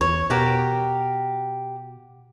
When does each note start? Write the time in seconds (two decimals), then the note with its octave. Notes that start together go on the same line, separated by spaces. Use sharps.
0.01 E2 C#5
0.30 B2 F#4 G4 A#4